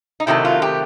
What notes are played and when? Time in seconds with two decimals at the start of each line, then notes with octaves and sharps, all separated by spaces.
0.20 D#4
0.27 C3 D#3 F#3 A3 E4
0.45 F4
0.62 G4